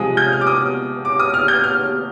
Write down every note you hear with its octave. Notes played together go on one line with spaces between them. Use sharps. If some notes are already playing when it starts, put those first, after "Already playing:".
Already playing: C3 F3 G#3 D#6
G6
F6
D6
D#6
D6
D#6
F6
G6
F6